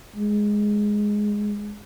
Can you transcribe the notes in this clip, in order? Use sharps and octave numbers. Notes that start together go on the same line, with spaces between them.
G#3